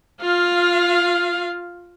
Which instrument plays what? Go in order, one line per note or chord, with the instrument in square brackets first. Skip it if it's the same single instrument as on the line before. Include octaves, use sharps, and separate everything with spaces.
[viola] F4 F5